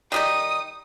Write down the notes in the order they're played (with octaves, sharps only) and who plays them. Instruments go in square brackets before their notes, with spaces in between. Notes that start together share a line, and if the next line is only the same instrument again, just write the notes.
[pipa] D#3 G3 D#4 [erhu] D#6